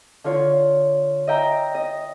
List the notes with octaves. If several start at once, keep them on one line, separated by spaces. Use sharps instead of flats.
D3 F4 C#5
D#5 E5 G5 A#5
D#5